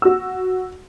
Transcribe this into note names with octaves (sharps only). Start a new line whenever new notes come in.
F#4 E6